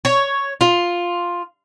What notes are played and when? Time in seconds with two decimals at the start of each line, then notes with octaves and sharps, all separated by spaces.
0.05 C#5
0.61 F4